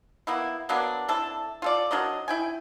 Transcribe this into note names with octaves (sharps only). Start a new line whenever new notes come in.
A#3 B3 E4
F#3 A#3 B3 D4
C4 D4 E4 A4
F4 A4 D5
F#3 D4 A#4 D#5
E4 G5 G#5